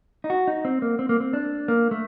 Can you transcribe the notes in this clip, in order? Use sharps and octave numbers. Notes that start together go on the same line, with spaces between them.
D#4
F#4
D#4
C4
A#3
C4
A#3
C4
D4
A#3
A3